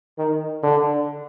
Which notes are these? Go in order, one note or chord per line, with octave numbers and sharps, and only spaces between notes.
D#3
D3